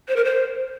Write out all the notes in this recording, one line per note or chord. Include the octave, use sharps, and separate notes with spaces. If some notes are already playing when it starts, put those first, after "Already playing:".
C5
A#4
C5